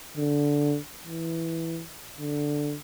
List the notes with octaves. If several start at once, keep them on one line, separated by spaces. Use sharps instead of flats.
D3
E3
D3